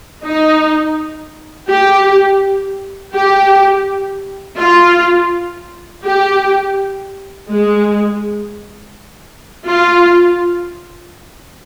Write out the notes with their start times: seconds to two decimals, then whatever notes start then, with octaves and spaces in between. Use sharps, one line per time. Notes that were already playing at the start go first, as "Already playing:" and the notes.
0.24 D#4
1.69 G4
3.15 G4
4.59 F4
6.04 G4
7.49 G#3
9.67 F4